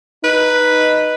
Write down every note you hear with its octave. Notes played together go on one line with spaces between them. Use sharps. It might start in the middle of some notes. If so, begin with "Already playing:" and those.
D#4 B4